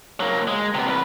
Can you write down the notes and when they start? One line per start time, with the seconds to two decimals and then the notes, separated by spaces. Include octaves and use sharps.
0.20 F#3 A#3
0.47 G#3
0.75 C3 B3
0.87 C2 B4